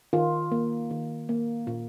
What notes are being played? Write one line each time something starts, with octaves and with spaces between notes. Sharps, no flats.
D#3 F4
A#3
D#3
A#3
A#2